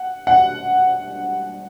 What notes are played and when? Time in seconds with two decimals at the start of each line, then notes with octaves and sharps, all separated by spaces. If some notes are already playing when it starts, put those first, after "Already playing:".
Already playing: F#5
0.27 F#5